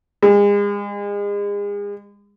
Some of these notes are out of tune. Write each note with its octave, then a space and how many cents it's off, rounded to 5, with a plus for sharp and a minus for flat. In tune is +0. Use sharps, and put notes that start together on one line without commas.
G#3 -35